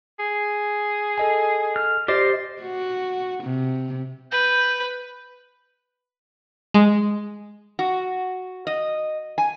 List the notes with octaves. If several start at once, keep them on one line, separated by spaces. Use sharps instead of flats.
G#4
A4 D#5 G#5
F6
G4 C5 D5 D#5 C6 D6 A6
F#4
C3
B4 G6
G#3
F#4
D#5
G#5